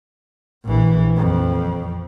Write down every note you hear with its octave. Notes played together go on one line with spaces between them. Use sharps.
A#1 E3
F2